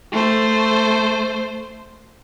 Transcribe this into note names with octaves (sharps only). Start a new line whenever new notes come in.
A3 C5